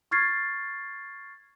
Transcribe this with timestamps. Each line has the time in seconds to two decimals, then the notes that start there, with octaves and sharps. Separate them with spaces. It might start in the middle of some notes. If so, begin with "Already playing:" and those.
0.11 C#6 F6 G#6 A6 C7